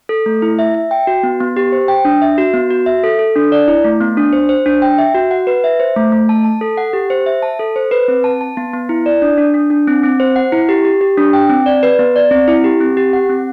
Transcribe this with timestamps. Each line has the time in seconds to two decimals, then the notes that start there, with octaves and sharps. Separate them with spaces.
0.09 A4
0.26 A3
0.42 E4
0.59 E5
0.74 E5
0.91 G5
1.07 F#4
1.23 B3
1.40 B3
1.57 G4
1.72 C5
1.88 G5
2.05 D4
2.22 E5
2.38 F#4
2.54 B3
2.70 F#4
2.86 E5
3.03 A4
3.19 A4
3.36 D4
3.52 D5
3.68 E4
3.85 A3
4.01 B3
4.17 D4
4.33 C5
4.49 C5
4.66 D4
4.82 G5
4.98 E5
5.15 F#4
5.31 F#5
5.47 B4
5.64 E5
5.80 C5
5.96 A3
6.12 A3
6.29 A5
6.45 A5
6.61 A4
6.77 F#5
6.93 G4
7.10 C5
7.26 E5
7.43 A5
7.59 A4
7.76 C5
7.91 B4
8.08 C4
8.24 A5
8.41 A5
8.57 B3
8.73 B3
8.89 E4
9.06 D5
9.22 D4
9.38 D4
9.54 D4
9.70 D4
9.87 C4
10.03 C4
10.20 C5
10.36 F#5
10.52 E4
10.69 G4
10.85 G4
11.01 G4
11.18 D4
11.33 G5
11.49 C4
11.66 D5
11.83 B4
11.99 B3
12.16 D5
12.31 C4
12.48 E4
12.64 G4
12.80 C4
12.97 G4
13.13 F#5
13.29 C4